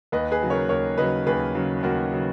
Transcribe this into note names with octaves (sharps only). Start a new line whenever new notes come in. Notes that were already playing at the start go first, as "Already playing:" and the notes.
D#2 B4 D#5
G#4 B4
C#3 F#3
A#4 C#5
D#2 A#4 C#5
C#3 F#3 B4 D#5
D#2 G#4 B4
C#3 F#3
D#2 F#4 A#4
C#3 F#3